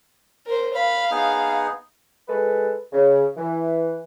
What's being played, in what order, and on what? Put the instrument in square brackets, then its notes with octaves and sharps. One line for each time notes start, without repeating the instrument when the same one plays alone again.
[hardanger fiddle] A#4 C5
[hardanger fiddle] F5 [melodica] B5
[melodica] B3 D#4 G#4
[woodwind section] G#3 A4 B4
C#3
E3